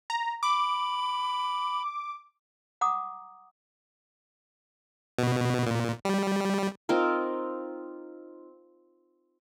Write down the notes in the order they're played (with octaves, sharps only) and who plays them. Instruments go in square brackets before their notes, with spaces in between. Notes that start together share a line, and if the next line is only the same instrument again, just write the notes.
[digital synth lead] A#5
[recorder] B5 [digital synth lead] D6
[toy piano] F#5 A#5 D6 D#6
[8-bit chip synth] B2
A#2
G3
[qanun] C4 D#4 F4 A#4